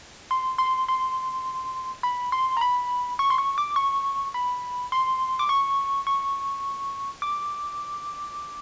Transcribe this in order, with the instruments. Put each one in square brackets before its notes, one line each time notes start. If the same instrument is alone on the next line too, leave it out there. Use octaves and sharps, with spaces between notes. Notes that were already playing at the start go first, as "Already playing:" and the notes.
[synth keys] C6
C6
C6
B5
C6
A#5
B5
C#6
C6
C#6
D6
C#6
B5
C6
D6
C#6
C#6
D6